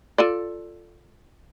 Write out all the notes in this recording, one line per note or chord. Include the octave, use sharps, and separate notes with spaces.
F4 A4 D5